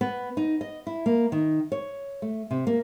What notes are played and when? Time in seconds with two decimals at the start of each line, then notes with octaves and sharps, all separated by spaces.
0.01 B3
0.37 D#4
0.61 D#5
0.87 E4
1.06 A#3
1.32 D#3
1.72 C#5
2.22 A3
2.51 C3
2.67 A#3